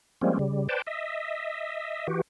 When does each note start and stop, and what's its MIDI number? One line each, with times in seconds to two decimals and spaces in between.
0.21 0.38 53
0.21 0.38 55
0.21 0.38 56
0.21 0.38 58
0.21 0.38 60
0.21 0.38 61
0.39 0.68 49
0.39 0.68 55
0.69 0.82 71
0.69 0.82 72
0.69 0.82 74
0.69 0.82 79
0.69 0.82 81
0.87 2.07 75
0.87 2.07 76
2.08 2.21 52
2.08 2.21 66
2.08 2.21 67